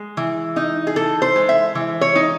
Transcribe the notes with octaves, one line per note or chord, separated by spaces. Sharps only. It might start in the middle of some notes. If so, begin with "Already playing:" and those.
Already playing: G#3
E3
D#4
G#4
E3 A4
C5
G#3
E5
E3
C#5
D#4